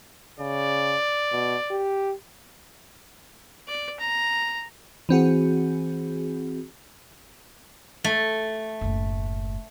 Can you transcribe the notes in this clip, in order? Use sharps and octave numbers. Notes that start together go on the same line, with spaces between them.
C#3 D5
B2
G4
D5
A#5
E3 C4 F#4 G#4
A3
F#1 A2